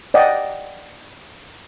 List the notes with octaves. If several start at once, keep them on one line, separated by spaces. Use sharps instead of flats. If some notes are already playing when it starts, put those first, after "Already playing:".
D5 D#5 F#5 G5